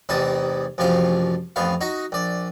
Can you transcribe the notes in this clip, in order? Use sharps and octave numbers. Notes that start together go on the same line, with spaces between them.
A1 E2 C3 D#4 A5 D#6
A1 F#2 C3 F3 F5 D6
A1 F2 B3 F5
D#4 F#4 D#5
A#1 D5